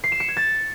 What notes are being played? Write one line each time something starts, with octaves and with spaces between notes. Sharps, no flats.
C7
E7
C#7
G#6
A6